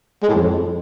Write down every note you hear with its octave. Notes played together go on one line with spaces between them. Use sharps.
G#3
A2
F2